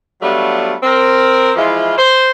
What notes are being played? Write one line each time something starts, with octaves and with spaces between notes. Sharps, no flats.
F#3 G3 A3 B3 D4 F4
C4 A#4
E3 F3 G#3 E4 F4
C5